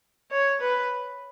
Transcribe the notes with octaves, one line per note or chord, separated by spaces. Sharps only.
C#5
B4